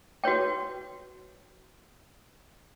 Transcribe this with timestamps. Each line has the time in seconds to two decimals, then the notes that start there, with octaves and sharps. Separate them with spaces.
0.24 F#4 B4 C#5 G5